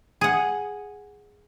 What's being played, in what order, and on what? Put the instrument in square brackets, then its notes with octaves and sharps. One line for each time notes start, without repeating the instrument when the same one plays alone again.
[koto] G#4 F#5